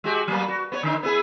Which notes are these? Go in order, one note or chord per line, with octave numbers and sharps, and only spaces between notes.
G#3 F#4 G4
F#3 A#3 B3
F#4
B3 F#4 C#5
D3 D#4
B3 E4 G#4